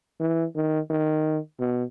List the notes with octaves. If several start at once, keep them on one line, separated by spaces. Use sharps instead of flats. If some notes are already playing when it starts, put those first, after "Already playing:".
E3
D#3
D#3
B2